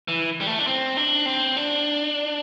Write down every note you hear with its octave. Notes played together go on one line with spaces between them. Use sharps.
E3
G3
A3
D4
C4
D4
C4
D4